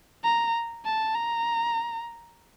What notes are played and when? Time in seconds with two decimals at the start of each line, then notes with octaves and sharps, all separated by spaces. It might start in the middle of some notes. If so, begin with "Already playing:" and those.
0.24 A#5
0.85 A5
1.14 A#5